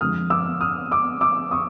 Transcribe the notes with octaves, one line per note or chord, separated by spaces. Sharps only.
F2 D3 F3 G#3 D#6 F6
D6 E6
D#6 F6
D6 E6
D6 E6
C#6 D#6